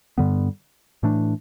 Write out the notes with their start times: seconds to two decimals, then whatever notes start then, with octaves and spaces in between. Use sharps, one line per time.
0.18 G2 D3 G3 B3
1.03 A2 E3 A3 D4